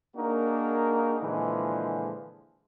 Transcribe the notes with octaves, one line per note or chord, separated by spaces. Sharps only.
A#3 D4 D#4 F#4 G#4 A#4
A#2 D3 E3 F3 G#3